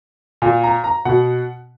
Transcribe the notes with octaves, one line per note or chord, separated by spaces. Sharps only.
A#2
A#5
A#5
B2 F#5